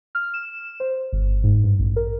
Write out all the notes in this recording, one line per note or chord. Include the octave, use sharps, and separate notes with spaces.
F6
E7
C5
G1
G#2
G2
A1
A#4